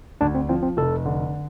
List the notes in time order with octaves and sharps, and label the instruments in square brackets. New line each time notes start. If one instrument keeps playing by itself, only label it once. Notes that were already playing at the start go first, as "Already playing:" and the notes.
[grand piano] D2 [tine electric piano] D4
[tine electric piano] C4
[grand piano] F3 [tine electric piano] C4
[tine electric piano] C4
[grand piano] F1 [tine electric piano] A4
[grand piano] D3